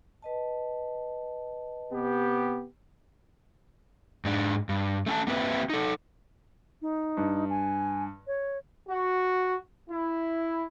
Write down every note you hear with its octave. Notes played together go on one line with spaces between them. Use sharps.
B4 D#5 A5
C3 B3 G4
G#2 D4
G2
A3 C#4 G#5 A5
A#3 C4 G4 B4 E5
D#4 A4
D#4
G2
G#5
C#5
F#4
E4